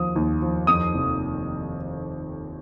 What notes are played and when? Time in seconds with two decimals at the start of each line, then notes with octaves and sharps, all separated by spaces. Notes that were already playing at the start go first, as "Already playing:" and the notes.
Already playing: D#2 F3 D#6
0.16 D#2
0.42 F3
0.67 F2 D#6
0.94 F1